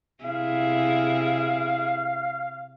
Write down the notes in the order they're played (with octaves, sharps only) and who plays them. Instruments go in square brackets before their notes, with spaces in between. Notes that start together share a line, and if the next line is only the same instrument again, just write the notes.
[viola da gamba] C3 E4 G#4 [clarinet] F5